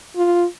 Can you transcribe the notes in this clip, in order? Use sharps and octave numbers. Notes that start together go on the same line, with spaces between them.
F4